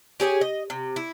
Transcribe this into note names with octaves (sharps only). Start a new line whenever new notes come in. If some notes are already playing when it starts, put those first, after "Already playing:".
G4 G#4 C#5 G#5
D#5
C3
E4